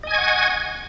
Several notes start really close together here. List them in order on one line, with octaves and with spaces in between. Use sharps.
D#5 G#5 G#6 C#6 F#5